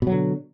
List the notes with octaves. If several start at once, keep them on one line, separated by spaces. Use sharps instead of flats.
B2 D3 F#3